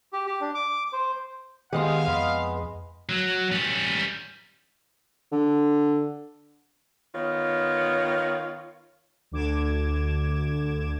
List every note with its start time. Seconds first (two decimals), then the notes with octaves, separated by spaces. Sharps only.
0.13 G4
0.27 G4
0.41 D4
0.55 D6
0.93 C5
1.73 D#3 G#3 B3 G4 G#4 D#5 F5 C6
2.07 F2 D#5 B5 C6
3.09 F#3
3.52 G3 C#4
5.32 D3
7.14 D#3 B3 F4 C#5
9.32 D2 D3 D6 G#6 E7